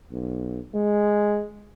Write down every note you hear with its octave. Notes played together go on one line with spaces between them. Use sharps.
B1
G#3